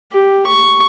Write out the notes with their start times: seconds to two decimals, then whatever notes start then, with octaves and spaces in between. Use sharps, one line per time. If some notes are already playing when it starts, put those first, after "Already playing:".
0.13 G4
0.47 C#6